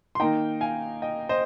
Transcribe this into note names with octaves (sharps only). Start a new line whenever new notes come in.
C6
D#3 A#3 D#4 G5 A#5
F5 G#5
D#5 G5
C5 D#5